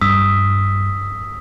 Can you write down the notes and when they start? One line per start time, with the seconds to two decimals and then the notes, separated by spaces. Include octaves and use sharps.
0.01 G2 D#6 E6 B6